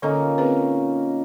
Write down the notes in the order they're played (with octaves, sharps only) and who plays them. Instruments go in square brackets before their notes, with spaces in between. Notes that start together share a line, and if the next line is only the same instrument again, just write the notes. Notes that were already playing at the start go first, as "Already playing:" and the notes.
[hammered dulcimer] A#2 C#4 D#4 [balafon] D3 A4
[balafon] C4 G#4 B4